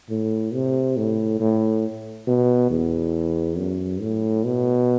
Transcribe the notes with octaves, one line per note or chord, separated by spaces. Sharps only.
A2
C3
A2
A2
B2
E2
F#2
A2
B2